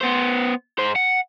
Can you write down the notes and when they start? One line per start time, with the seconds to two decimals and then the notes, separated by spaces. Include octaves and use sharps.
0.01 B3 C5
0.78 G#2 C5
0.96 F#5